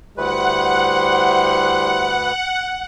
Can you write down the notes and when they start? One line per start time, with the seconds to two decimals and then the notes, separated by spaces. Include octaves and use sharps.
0.17 D2 G3 E4 B4 C5 F#5